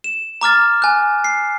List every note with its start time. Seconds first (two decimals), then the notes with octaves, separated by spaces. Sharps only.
0.04 E7
0.41 A#5 D6 F6 A6
0.82 G#5 F#6
1.24 C7